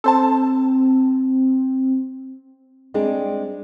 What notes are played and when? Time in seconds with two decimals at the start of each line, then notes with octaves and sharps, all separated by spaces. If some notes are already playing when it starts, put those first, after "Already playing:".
0.04 C4 A4 C5 A5
2.94 G3 G#3 C4 D4 G#4